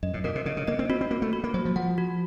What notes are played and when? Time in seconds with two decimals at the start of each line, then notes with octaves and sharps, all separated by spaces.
0.03 F#2 D#5
0.14 A2
0.24 A#2 A#4
0.35 C3
0.46 C#3 D#5
0.57 C#3
0.68 A#3 D#5
0.79 C4
0.89 C4 F#4
1.01 C4
1.11 A#3 F#4
1.22 A3
1.33 F#4
1.44 A#3
1.54 F#3 C5
1.65 F3
1.76 F3 F#5
1.98 F#4